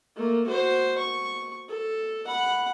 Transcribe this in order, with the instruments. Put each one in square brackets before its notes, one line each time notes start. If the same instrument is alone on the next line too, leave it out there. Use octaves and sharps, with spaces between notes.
[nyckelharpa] A3 A#3
F#4 C5
C#6
A4
F#5 B5